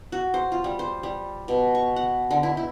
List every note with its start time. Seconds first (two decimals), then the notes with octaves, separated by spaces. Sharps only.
0.12 F#4
0.34 C5
0.52 F4
0.64 G3
0.79 C5
1.03 G3
1.48 B2
1.75 C#6
1.96 F#5
2.31 D3
2.43 E4
2.57 E4